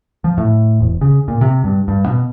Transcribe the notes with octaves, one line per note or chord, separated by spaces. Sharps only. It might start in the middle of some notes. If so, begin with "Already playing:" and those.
F3
A2
E1
C#3
A#2
C3
G2
G2
B2